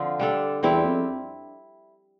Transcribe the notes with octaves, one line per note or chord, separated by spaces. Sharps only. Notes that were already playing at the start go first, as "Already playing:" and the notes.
Already playing: D3 F3 C4 F4
G3 D4 A4
E2 G3 C4 E4
F2